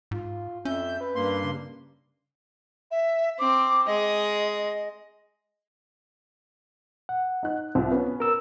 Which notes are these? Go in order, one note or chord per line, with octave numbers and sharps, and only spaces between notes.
G#2 F4
F2 C#4 E5 G6
B4
G2 A#3 C6
C#3
E5
C4 D6
G#3 D#5 D#6
F#5
D#4 F#6
C2 C4 F4
B3 C#4
A#4 E6